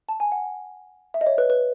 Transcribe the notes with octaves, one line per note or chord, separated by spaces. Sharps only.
A5
G#5
F#5
E5
D#5
C#5
B4
B4